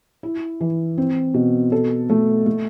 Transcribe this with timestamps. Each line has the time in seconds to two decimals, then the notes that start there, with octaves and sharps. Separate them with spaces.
0.23 E4
0.61 E3
0.98 C4
1.34 B2
1.72 A4
2.10 A3
2.46 A3